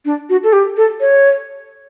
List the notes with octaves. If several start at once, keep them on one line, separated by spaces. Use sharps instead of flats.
D4
F#4
A4
G4
A4
C#5